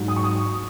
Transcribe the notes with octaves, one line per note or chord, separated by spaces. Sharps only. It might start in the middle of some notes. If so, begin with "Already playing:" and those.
Already playing: G#2 F#3
D#6
C#6
D#6